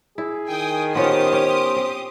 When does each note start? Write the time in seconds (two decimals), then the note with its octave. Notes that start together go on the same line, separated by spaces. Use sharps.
0.18 E4 G#4
0.50 D#3 G5 G#5 D#6
0.95 B3 C#4 F4 G4 C5 D#6
1.33 C#4
1.76 C4